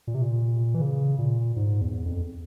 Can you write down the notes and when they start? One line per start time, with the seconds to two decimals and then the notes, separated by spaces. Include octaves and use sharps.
0.07 A#2
0.15 C3
0.22 A#2
0.75 E3
0.81 C#3
1.19 A#2
1.56 G#2
1.81 E2
2.06 F2